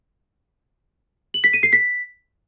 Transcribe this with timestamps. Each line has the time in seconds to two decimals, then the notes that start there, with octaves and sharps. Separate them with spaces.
1.34 F#7
1.44 B6
1.53 D#7
1.63 C7
1.73 B6